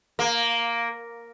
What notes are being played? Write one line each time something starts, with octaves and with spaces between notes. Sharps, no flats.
A#3